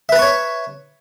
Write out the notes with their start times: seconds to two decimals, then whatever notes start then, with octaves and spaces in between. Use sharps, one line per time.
0.09 E5
0.12 B4
0.16 A5
0.19 C#6
0.22 C#5